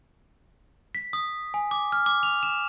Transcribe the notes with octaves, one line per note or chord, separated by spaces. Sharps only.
B6
D#6
G#5
D6
F6
D6
F7
E7